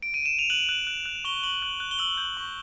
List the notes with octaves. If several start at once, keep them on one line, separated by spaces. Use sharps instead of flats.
D7
D#7
E7
F7
F#6 F#7
F#6
F#6
F#6
C#6 G7
C#6 F#7
F#6
F#6
G7
E6 F#7
G6
C#6